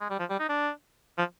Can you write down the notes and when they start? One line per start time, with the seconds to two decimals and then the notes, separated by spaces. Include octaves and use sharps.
0.01 G#3
0.10 G3
0.19 F3
0.30 G3
0.39 D#4
0.49 D4
1.18 F3